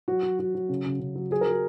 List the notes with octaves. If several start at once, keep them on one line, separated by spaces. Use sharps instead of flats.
F#3 F#4
F#3
F#3 F#4
F#3
C#3
C#3
C#3
F#3
F#3 G#4
A#4
F#3
G#4